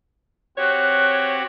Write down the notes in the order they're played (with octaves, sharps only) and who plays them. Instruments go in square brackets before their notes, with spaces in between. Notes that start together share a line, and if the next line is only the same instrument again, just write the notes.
[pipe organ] C4 F#4 G4 [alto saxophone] C#5 [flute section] F#6